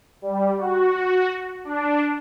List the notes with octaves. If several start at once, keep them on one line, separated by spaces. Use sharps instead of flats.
G3
F#4
D4